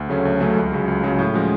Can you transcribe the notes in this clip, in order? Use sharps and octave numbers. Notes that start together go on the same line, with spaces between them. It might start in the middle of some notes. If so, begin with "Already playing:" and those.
Already playing: D2
C#3 F#3 A3 C#4
D2
C#3 F#3 A3 C#4
C#2
C#3 F#3
C#2
C#3 F#3
A2
F3 G#3 C#4 F#4